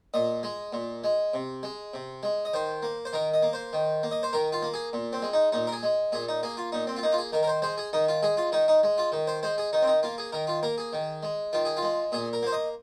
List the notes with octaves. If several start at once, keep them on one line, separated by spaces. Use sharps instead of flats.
A#2 D#5
G#3
A#2
G#3
C3
G#3
C3
G#3
D#5
D#3 C5
A#3
C5
D#3 A#4
D#5
A#3
C5
D#3
A#3
D#5
C5
D#3 A#4
F4
A#3
G#4
A#2
C4
G#3
D#4
A#2 D#4
A#4
G#4
G#3
A#2 G#4
D#4
A#3 G#4
F4
A#2 D#4
C4
F4
A#3 D#4
F4
G#4
D#3 A#4
A#4
C5
G#3 C5
G#4
D#3 D#4
F4
G#3 G#4
F4
D#3 D#4
D#4
G#3
F4
D#3
C5
G#3 C5
G#4
D#3 D#4
C4
D#4
A#3 F4
G#4
D#3 A#4
F4
A#3 A#4
G#4
D#3
G#3
D#3 F4
G#4
F4
G#3
A#2 G#4
A#4
A#3 C5
D#5